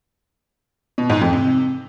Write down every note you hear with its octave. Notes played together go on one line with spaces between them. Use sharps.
B2
G#2
F2
C3